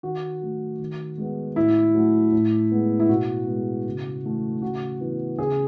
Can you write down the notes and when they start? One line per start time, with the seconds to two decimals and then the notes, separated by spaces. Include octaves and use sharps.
0.03 D#3 F#4
0.41 F#3 A3
0.80 D#3
1.18 G#3 B3
1.56 A2 E4
1.95 F#3 A3
2.32 A2
2.71 G#3 B3
3.00 E4
3.09 B2 F#4
3.48 G#3 B3
3.86 C#3
4.24 E3 A3
4.62 C#3 F#4
5.00 E3 B3
5.39 C#3 G#4